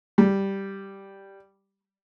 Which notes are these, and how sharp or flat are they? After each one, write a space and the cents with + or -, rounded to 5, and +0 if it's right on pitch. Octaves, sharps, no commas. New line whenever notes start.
G3 +0